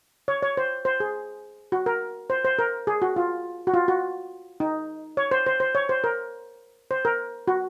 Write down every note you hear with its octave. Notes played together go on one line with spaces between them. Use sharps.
C#5
C#5
C5
C5
G#4
F#4
A#4
C5
C5
A#4
G#4
F#4
F4
F#4
F4
F#4
D#4
C#5
C5
C5
C5
C#5
C5
A#4
C5
A#4
F#4